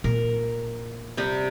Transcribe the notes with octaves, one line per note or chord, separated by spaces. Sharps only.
A#2 A#4
C3 G3 G4